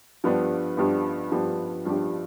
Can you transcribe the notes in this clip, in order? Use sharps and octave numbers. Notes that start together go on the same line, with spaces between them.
G2 F3 B3 D4 G4
G2 F3 B3 D4 G4
G2 F3 B3 D4 G4
G2 F3 B3 D4 G4